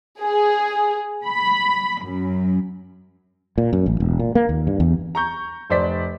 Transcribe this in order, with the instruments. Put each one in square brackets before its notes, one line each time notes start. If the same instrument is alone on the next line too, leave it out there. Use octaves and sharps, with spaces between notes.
[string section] G#4
B5
F#2
[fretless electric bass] A#2
F#2
A1
E1
A#2
A#3
D#2
G2
E2
[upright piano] A#5 C#6 G6
F1 C5 D5 B6